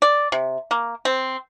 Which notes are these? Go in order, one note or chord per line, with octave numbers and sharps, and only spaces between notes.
D5
C3
A#3
C4